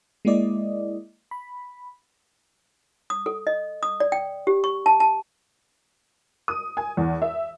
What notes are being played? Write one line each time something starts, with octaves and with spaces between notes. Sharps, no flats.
G#3 A#3 E4 D5 D#5
B5
D#6
A4
D#5
D#6
D5
G5
G4
C#6
A5
A5
D#6
G#5
E2
E5